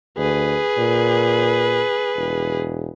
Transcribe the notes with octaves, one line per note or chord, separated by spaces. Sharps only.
D2 G#4 B4
A#2
E1